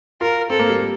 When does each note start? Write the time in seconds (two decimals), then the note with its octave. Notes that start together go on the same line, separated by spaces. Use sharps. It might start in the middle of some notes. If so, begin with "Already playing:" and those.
0.21 F4 A#4
0.50 C4 A4
0.59 A#3
0.69 G3